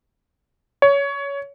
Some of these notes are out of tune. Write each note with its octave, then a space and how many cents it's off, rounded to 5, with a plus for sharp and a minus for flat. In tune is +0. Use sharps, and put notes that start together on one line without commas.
C#5 +20